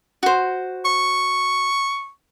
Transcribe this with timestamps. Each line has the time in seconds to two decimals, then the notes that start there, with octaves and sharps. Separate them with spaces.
0.23 F#4 C5
0.85 C#6